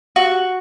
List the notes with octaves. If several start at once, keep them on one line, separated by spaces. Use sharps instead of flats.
F#4